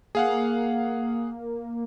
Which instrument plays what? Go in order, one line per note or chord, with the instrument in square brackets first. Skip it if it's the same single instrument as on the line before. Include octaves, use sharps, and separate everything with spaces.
[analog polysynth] A#3 [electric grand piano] G#4 F5 F#5